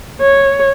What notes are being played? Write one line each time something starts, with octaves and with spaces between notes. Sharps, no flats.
C#5